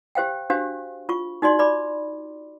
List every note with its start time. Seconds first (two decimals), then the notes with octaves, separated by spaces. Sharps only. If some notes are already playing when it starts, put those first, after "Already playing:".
0.15 G4 C5 F5 G5
0.50 D4 F#4 G4 C5 F5
1.09 F4 C#6
1.42 D#4 F#4 D5 C6
1.59 D5 B5 D6